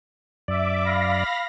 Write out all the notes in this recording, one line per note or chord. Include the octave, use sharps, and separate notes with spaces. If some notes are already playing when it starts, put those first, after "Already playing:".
F#2 D5 E5 D6
F5 B5 A#6